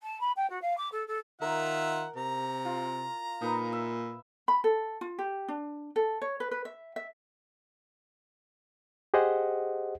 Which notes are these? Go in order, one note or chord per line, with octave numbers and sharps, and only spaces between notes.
A5
B5
G5
F#4
F5
D6
A4
A4
D#3 F4 A#4 E5 F#5
C3 A#5
F4
A#2 D#4 B4
E5
B5
A4
F4
G4
D4
A4
C#5
B4
B4
E5
E5
G4 G#4 C5 D#5 F#5